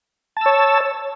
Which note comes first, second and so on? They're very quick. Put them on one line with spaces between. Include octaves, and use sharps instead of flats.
A5 E6 C#5